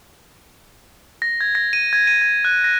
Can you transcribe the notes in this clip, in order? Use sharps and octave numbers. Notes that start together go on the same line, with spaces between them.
A#6
G#6
A#6
D#7
G#6
D#7
G#6
F#6
A#6